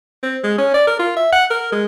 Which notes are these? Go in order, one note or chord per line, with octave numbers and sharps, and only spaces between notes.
C4
G#3
C#4
D5
A#4
F4
E5
F#5
A#4
G#3